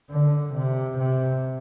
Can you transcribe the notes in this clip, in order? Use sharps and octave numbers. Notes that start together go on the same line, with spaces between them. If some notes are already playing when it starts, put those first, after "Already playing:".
D3
C3
C3